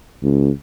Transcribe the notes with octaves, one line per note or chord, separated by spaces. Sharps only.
C#2